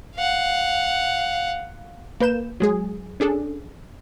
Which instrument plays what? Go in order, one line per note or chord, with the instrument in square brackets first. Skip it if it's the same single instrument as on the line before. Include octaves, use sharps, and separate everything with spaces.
[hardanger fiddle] F5 F#5
[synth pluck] A#3 B4 G6 E7
F#3 G#3 G#4
C#4 D4 G#4 A4